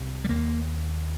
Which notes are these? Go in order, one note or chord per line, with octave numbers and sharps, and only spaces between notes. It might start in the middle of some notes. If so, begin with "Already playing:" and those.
Already playing: C2 C3
G3
D#2 A#3